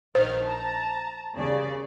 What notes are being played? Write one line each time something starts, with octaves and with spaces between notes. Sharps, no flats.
A#1 D#3 C5 F6
A5 A#5
D#2 C#3 D5